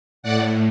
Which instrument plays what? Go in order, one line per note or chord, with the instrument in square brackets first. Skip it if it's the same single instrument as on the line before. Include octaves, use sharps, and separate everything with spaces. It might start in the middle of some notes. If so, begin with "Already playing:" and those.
[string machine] A2 D5 F#5